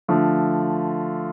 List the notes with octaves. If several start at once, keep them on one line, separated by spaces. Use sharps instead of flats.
D3 F3 A3